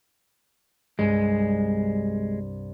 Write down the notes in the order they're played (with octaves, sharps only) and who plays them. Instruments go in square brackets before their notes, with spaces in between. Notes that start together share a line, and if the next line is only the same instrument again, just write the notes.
[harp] C2 G2 [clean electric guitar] G#3